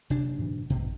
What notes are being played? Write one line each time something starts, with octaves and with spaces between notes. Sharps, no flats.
F#1 C3 D4
G#2 B2 E3
A#1 G2 B2